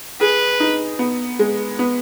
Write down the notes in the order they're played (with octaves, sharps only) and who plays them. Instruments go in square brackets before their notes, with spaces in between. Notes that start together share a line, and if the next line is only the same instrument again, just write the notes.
[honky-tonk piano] G#4 [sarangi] B4
[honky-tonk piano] D#4
B3
G#3
B3